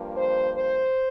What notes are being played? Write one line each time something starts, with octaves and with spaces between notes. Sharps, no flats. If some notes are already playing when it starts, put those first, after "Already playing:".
Already playing: G2 F3 A#3
C5
C5